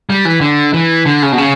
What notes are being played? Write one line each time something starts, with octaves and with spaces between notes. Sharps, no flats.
G3
E3
D3
E3
D3
C#3
B2
C#3